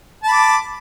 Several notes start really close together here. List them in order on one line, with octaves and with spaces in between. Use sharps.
A5 B5 D6